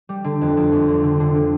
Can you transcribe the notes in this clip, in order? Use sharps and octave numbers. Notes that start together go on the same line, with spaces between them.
G3
D3
F2
F2
F2
D3
D3
D3
D3